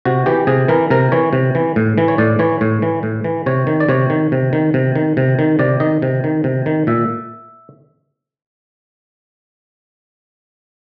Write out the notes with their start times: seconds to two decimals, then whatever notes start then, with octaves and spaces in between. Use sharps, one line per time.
0.05 C3 F#4
0.26 E3 G4
0.47 C3 G#4
0.68 E3 A#4
0.90 C3 A#4
1.12 E3 C#5
1.33 C3
1.55 E3
1.76 A2
1.98 E3
2.08 C#5
2.18 A2 D5
2.39 E3 C#5
2.61 A2 C#5
2.82 E3
3.03 A2
3.24 E3
3.46 C3 C#5
3.67 D#3
3.80 D5
3.89 C3 C#5
4.10 D#3
4.32 C3
4.53 D#3
4.74 C3
4.96 D#3
5.17 C3
5.39 D#3
5.59 C3 D5
5.80 D#3 D#5
6.02 C3
6.24 D#3
6.44 C3
6.66 D#3
6.87 A#2 E5